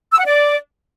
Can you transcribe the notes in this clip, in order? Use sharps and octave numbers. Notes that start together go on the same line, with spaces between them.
E6
F#5
D5